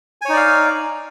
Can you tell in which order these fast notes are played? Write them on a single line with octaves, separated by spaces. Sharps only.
G#5 C#5 D#4 D5 F5